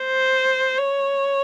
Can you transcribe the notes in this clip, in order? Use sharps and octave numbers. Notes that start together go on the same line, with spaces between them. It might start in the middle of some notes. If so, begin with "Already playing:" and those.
Already playing: C5
C#5